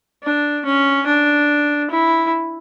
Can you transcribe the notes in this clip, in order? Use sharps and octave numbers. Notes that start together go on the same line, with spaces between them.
D4
C#4
D4
E4